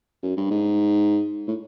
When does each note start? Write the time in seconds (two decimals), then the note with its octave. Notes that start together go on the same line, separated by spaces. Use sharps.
0.23 F#2
0.37 G2
0.51 G#2
1.48 A2